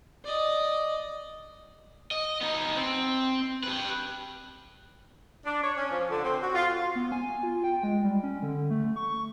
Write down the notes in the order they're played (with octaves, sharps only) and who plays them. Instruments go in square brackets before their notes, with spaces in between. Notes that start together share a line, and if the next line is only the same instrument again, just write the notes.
[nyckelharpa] D5 D#5
[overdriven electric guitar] D#5
B3 D#4
C4
G4 B4
[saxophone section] D4
C#5
C#4
F3
D3
C4
F#4
F4
[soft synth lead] B3
G#5
F4
G5
G#3
G3
C#4
D3
A3
C#6